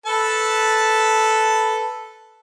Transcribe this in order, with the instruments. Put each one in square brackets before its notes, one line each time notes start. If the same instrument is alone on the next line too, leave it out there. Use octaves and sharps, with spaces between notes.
[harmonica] A4 B4 A5